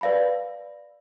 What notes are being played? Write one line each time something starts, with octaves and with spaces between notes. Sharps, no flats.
B4 D5 F5 A5 B5